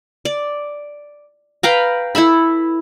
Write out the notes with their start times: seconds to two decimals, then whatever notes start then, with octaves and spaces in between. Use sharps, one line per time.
0.25 D5
1.63 B4 F5 G5 A#5
2.15 E4 A4 E5 B5